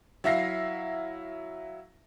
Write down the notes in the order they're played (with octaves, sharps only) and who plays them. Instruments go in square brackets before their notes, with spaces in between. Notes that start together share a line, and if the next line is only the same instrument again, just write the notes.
[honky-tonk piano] F#3 E4 E5 F5 A#6 C7